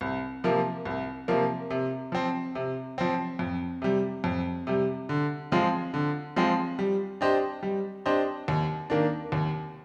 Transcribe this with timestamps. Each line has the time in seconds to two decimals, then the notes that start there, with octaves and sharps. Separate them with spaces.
0.01 C2
0.44 C3 F3 A#3
0.85 C2
1.28 C3 F3 A#3
1.71 C3
2.12 F3 C4
2.55 C3
2.98 F3 C4
3.39 F2
3.82 C3 G3
4.24 F2
4.67 C3 G3
5.09 D3
5.52 F3 G#3 C4 F4
5.94 D3
6.36 F3 G#3 C4 F4
6.79 G3
7.21 D4 G4 C5 D#5
7.63 G3
8.06 D4 G4 C5 D#5
8.48 D#2
8.90 D#3 A#3 D4
9.32 D#2